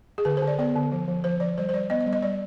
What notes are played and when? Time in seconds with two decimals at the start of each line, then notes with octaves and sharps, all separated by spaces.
0.18 G#4
0.25 D3 B4
0.37 C5
0.42 D3
0.48 D5
0.59 B3 D5
0.76 D3
0.92 F3
1.08 F3
1.24 F3 C5
1.40 F3 D5
1.58 G3 C5
1.69 C5
1.74 G3 D5
1.90 B3 D#5
2.00 D#5
2.07 G3
2.13 D#5
2.22 G3 D5